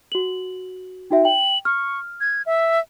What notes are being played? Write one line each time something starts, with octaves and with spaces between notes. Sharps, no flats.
F#4 F#7
D#4 F#4 E5 G5
G5 F#7
C#6 F6
G#6
E5